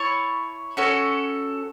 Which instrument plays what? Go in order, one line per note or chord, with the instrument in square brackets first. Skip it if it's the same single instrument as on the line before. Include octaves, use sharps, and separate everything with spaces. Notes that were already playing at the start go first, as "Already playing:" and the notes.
Already playing: [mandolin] E4 C#5 A5 [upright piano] C#6
[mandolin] C#4 F#4 A4 C#5